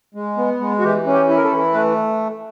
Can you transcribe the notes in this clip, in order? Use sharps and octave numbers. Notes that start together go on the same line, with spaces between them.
G#3
B3
G#3
F#4
E3 G4
C#4
G4
E4
A#4
A4
E3
A3 B4